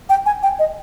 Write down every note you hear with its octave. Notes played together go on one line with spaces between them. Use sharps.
G5
G#5
G5
D#5